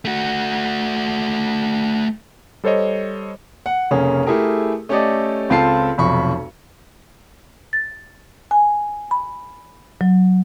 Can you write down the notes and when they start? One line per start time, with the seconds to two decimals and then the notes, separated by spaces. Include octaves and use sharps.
0.05 A3 F#4
2.64 G3 A4 C5 C#5 D#5
3.66 F#5
3.91 F1 C#3 A#3 C#4 G#4
4.27 A3 E4 G4 G#4 A#4
4.89 A3 C#4 G4 A4 D5 D#5
5.50 C#2 C4 F4 A4 A5 C7
5.98 F1 B1 F2 B5 C#6
7.73 A6
8.51 G#5
9.11 B5
10.01 F#3